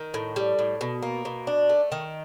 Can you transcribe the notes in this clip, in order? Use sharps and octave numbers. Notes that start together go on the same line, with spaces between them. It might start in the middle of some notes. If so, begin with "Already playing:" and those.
Already playing: D#3
A2
G3
A2
B2
A#3
B2
D4
A3
D#3